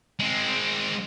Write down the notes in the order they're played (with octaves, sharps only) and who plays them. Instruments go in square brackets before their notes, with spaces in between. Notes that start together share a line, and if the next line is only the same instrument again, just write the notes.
[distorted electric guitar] G#3 C4